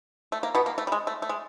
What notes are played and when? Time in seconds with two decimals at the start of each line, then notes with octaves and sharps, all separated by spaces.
0.32 A3
0.43 A#3
0.55 B2 B3
0.66 A#3
0.78 A3
0.87 G3
0.92 G#3
1.07 A3
1.22 A3
1.29 G#3